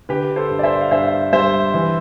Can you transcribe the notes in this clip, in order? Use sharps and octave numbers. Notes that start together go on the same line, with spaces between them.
D3 G4 B4
A4 C5
G2
D5
C5 E5
F5
G2 C5 E5
G3 C5 E5
E3